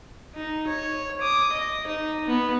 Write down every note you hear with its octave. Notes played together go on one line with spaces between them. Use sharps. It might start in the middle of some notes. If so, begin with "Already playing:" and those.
D#4
C#5
D6 D#6
D#5
D#4
B3